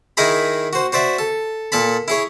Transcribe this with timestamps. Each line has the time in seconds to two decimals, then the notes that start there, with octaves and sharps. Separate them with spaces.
0.17 D#3 D#4 E4 G#4 A#5 B5
0.73 F#4 C5
0.92 F#4 C5 D5 E5
1.19 A4
1.72 A#2 A4 A5 B5
2.08 E4 G#4 C#5